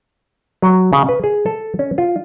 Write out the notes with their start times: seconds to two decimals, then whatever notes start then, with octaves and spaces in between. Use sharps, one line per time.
0.62 F#3
0.93 C#3
1.09 B4
1.24 G#4
1.46 A4
1.79 C#4
1.98 F4